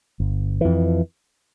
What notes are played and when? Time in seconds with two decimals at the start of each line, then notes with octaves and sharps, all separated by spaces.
0.20 G1
0.61 F2 E3